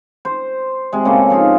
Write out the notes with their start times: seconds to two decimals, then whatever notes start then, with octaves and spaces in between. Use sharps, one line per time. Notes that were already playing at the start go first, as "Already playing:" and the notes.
0.25 C5
0.92 C3 G#3
1.05 C#3 A#3 A4
1.30 F3 D#4 F4